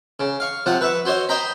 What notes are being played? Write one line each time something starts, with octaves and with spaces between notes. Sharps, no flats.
C#3
F5 C#6
C3 F3 F#5
B4 E5 C#6
F#4 C5 C#5 D#5
C5 D#5 G5 A#5 B5